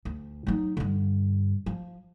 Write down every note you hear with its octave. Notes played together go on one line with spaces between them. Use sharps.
D2
F#3 D#4
G2 D3
F3